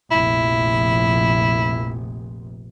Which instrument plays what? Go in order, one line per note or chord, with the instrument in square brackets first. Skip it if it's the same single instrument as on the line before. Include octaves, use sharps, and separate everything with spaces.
[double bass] F1 A#1 [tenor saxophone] E4